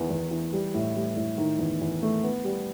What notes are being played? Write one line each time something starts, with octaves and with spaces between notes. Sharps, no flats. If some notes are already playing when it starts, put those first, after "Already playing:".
Already playing: E2 D#3 E3
E2
E3
G3
A2
G3
A2
D#3
E2
E2
A3
B3
G3